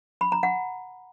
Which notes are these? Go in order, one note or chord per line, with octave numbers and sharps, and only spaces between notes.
B5
A#5
F#5